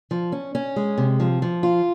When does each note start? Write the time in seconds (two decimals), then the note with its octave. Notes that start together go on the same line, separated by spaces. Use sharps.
0.11 F3
0.32 C#4
0.55 C#4
0.76 G#3
0.98 C3
1.20 F3
1.42 F3
1.63 F4